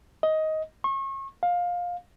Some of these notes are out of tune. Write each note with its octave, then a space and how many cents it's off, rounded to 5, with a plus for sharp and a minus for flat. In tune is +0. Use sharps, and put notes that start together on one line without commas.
D#5 +15
C#6 -35
F5 +20